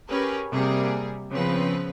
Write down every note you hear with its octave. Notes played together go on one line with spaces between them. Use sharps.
C#4 G4 G#4 A#4 B4
C3 G3 A#3 G#4
C#3 F3 B3 C4 B4